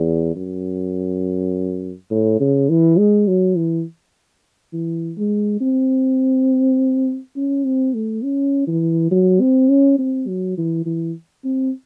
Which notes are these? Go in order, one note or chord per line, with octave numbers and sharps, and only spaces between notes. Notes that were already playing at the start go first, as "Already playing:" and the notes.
Already playing: E2
F#2
A2
C#3
E3
G#3
F#3
E3
E3
G#3
C4
C#4
C4
A3
C#4
E3
F#3
C4
C#4
C4
F#3
E3
E3
C4